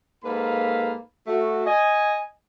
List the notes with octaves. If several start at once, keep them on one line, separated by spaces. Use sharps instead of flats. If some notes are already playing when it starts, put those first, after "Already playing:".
G#2 A#3 A4 B4 F5 B5
A3 F#4
D#5 G#5